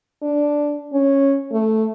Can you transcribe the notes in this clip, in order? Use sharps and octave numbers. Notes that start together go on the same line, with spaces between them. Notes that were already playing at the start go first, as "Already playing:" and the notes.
D4
C#4
A3